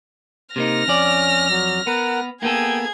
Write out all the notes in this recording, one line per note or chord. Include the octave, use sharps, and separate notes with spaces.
C3 A#3 D#4 F6 A#6
F2 C#4 D5
F#3
B3 A#4 F#5
A#3 B3 G#4 A4 G5 G#6